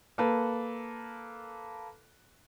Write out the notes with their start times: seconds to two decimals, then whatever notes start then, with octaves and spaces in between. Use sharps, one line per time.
0.18 A#3 A4 B4